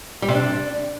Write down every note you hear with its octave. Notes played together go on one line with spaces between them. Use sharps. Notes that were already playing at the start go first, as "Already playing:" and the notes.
G3
C3
D4